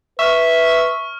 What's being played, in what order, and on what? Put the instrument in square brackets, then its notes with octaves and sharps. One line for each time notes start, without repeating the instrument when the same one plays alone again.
[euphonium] B4 [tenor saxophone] E5 [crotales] C#6 F6